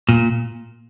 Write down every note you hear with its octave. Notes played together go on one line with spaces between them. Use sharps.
A#2